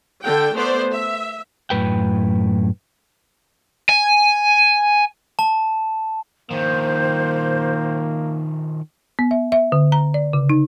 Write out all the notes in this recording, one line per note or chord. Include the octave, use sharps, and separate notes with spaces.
D3 A4 G5
A3 B3 C5 D5
E5
F#2 A2 B4 G5
G#5
A5
D#3 F3 A#3 C5
B3
E5
E5
D3
A#5
D5
C#3
D#4